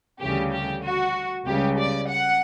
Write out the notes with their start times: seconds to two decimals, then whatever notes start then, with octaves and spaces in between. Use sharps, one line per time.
0.20 D2 C#3 E3 G3 G4
0.52 G4
0.83 F#4
1.46 C#2 C#3 G3 G4
1.78 D5
2.08 F#5